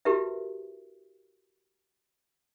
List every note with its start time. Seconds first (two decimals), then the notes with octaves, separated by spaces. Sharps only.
0.05 E4 F#4 G4 A#4 B4 E5